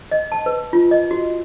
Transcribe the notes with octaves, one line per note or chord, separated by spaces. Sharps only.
D#5
A5
B4
F4
D#5
F#4